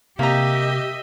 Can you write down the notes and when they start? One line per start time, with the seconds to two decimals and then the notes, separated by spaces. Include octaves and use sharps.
0.19 C3 A#3 G4 D#5 E5 A#5